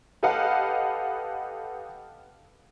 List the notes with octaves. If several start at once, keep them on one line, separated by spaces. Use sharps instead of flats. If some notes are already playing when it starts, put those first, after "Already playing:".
G4 A4 B4 D#5 F5 F#5